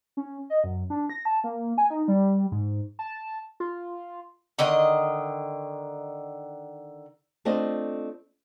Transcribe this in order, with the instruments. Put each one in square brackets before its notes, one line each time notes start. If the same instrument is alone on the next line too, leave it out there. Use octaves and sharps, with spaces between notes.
[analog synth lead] C#4
D#5
F#2
D4
A#6
A5
A#3
G#5
D#4
G3
G#2
A5
F4
[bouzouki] D3 D#3 D#5
[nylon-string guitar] A3 C4 D4 F4 D#5